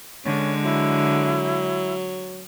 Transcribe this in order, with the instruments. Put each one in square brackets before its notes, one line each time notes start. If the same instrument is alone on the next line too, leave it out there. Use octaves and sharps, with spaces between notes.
[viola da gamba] D3 G#3 [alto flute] C#4
[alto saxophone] F#3 [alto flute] E4